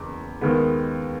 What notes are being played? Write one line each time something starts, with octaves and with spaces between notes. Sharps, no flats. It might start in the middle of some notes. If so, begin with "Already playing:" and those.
Already playing: F#1 E2
D#2 D#3 G#3 B3